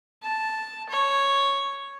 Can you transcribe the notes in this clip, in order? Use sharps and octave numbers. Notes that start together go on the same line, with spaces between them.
A5
C#5